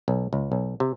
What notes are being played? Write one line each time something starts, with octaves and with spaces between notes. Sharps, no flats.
B1
C#2
B1
C3